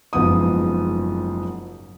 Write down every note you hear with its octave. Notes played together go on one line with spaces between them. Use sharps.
F#1 G#2 F3 B3 D#6